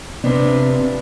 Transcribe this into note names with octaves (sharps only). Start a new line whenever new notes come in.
C3 F3 B3 C4 D4